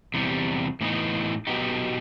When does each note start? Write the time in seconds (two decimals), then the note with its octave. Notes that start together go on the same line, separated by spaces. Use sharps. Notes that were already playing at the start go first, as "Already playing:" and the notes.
0.14 E2 C3 G3
0.81 A2 E3 B3 D#4
1.47 B2 F#3 B3 D#4 G4